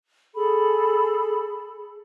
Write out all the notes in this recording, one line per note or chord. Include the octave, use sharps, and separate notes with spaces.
G#4 A4 B5